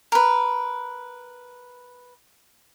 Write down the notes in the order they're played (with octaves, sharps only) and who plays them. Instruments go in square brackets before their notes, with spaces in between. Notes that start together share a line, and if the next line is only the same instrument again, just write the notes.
[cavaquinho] A#4 B4